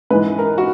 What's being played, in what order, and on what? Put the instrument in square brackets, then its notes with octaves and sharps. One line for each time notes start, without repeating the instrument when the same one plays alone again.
[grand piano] G#2 E3 G#3 B4
A#4
F#4